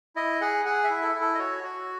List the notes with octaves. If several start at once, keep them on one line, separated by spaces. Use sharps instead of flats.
E4 D#5
G#4 F#5
G#4 F#5
E5
E4
A4
E4
A4
D#5
F#4 C#5
F#4